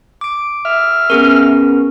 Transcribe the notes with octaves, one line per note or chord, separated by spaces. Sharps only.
D6 D7
E5 F6
B3 C#4 G#4 A#4